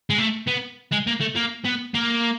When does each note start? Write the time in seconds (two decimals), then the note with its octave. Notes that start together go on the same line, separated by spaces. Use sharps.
0.10 G#3
0.18 A3
0.48 B3
0.92 G#3
1.07 A#3
1.21 A3
1.36 A#3
1.65 B3
1.95 A#3